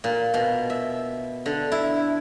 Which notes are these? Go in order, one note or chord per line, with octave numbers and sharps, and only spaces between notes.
A#2
B2
E5
D3
E4